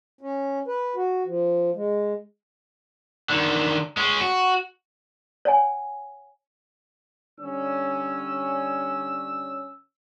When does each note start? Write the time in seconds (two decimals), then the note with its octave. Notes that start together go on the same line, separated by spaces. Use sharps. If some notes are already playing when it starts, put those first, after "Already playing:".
0.21 C#4
0.68 B4
0.96 F#4
1.26 F3
1.75 G#3
3.30 D3 D#3
3.97 G#3 C#4
4.21 F#4
5.45 C#5 F#5 G#5
7.40 D3 G3 C#4 E6